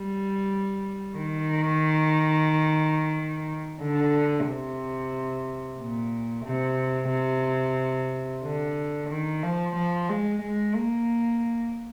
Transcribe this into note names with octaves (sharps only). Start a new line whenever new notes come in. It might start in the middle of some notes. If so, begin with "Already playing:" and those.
Already playing: G3
D#3
D3
C3
A#2
C3
C3
D3
D#3
F3
F3
G#3
G#3
A#3